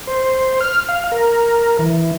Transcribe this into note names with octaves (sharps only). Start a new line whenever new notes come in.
C5
F6
F5
A#4
E3